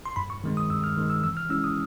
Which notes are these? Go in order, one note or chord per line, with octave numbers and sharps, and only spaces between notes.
C6
G2 B5
C#6
D#3 G#3 C4
D#6
G2 E6
F6
D#3 G#3 C4
E6
E3 E6
F6
G#3 C#4 E4 E6
D#6